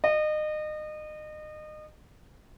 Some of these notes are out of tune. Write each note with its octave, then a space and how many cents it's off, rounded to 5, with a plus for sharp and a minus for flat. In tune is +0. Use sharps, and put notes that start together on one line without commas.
D#5 -30